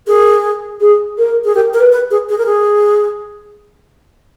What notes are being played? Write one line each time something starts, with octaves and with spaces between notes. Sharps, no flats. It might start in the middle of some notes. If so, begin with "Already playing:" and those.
G#4 A#4
G#4
A#4
G#4
G4 A#4
A#4
B4
B4
G#4
G#4
A#4
G#4